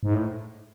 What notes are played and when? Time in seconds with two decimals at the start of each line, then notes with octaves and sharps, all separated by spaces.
0.03 G#2
0.14 A2